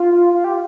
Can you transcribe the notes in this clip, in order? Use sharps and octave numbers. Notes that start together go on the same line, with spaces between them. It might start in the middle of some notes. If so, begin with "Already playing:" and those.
Already playing: F4
F4
G4